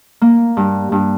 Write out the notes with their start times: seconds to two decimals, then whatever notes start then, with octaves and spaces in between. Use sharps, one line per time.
0.21 A#3
0.57 G2
0.92 G2